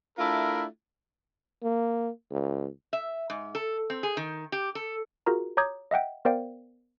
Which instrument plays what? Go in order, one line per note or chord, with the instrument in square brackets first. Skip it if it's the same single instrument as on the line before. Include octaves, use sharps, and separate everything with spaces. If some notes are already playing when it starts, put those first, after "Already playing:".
[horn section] A3 D4 E4 F4 A4 A#4
[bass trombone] A#3
C#2
[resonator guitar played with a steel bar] E5
G#2
A4
C4
G#4
D#3
G4
A4
[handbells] F4 F#4 G#4 A#4 A#5
C#5 A#5 D6 D#6 G6 G#6
D#5 E5 F#5 G5
B3 A#4 C5 D5 F5 G5